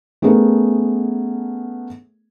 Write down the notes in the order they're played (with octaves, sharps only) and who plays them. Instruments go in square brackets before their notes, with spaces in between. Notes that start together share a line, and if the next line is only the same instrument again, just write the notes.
[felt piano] A3 B3 C#4 G#4 A#4